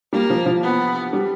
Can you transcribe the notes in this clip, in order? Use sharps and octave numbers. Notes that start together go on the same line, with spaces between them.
G3 A#3
F3
F3
B3
G3